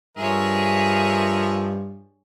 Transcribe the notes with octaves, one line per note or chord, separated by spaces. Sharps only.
G2 F3 G#4 A#4 C#5 E5